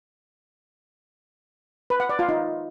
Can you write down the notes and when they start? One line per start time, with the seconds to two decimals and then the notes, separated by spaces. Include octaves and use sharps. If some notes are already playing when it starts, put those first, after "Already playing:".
1.90 B4
2.00 F#5
2.09 D5
2.19 F4
2.29 D#4